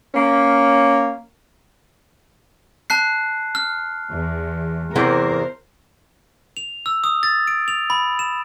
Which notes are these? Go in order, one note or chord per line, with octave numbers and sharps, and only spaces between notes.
A#3 C#4
A5 F#6 C7
F6
E2
E2 C3 E3 A#4 C5
F7
E6
D#6
A6
D7
F7
B5
E7